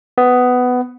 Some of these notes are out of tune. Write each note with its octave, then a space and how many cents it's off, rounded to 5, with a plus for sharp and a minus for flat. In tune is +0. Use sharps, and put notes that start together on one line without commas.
B3 +15